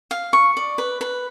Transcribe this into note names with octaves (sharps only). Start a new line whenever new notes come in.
F5
C#6
D5
B4
B4